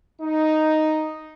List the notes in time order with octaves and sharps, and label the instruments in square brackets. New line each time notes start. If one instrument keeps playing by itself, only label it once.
[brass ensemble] D#4